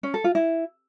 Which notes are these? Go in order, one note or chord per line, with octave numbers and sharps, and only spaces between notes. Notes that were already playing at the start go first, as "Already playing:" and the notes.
C#4
A4
F4
E4